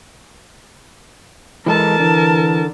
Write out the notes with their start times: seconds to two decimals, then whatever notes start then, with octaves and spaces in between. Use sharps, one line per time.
1.66 E3 G#3 A4 A#4 A5
2.00 D3 E3